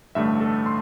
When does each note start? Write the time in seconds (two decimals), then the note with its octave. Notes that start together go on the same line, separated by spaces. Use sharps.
0.15 A1 G2 D3 A3 E5
0.41 A4
0.66 C6